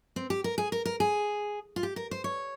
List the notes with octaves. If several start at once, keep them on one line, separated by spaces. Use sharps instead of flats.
C4
G4
A#4
G#4
A#4
A#4
G#4
F4
G4
A#4
C5
C#5